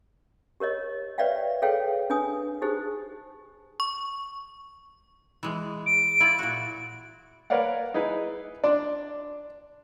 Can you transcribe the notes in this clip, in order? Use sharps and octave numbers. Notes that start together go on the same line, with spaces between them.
G4 A#4 C#5 D#5
B4 C#5 D5 E5 F5 G5
G#4 A4 B4 C#5 F5 G5
D4 B4 G#5 D#6
D#4 G4 G#4 C5
C#6
E3 G#3
D7
E4 F4 D5
A#2 F#4
A#4 B4 C#5 D5 F5 F#5
D#4 E4 G#4 B4
D4 D5 C6